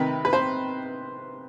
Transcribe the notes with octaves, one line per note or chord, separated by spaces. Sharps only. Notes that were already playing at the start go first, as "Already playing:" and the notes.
Already playing: C3 D#3 B4
B4
C5